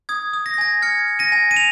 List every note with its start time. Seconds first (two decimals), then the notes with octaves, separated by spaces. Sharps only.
0.09 D#6 G#6
0.33 D#6
0.46 A#6
0.54 G#6
0.58 G#5 A#6
0.82 F6 G#6 C#7
1.08 F6
1.19 A#6 D#7
1.32 G#5
1.51 D#7
1.57 F7